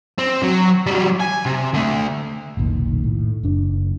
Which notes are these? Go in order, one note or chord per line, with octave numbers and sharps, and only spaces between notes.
C4
F#3
F#3 G3
G#5
C3
D3 A3
F1 B1 A#2 D#3
A2
F#1 D4